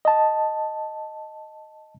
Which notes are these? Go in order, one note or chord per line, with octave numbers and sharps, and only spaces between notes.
D#5 A5